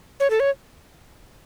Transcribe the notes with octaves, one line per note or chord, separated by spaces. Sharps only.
C#5
A4
C#5